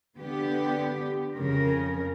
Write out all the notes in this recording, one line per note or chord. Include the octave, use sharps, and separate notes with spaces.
D3 B3 G4
F2 C#3 A#4